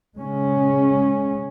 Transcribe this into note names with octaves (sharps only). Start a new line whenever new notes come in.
C#3 G#3 C#4